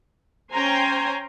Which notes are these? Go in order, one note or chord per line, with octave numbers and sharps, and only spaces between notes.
C#4 C5 G5 G#5 A#5 C6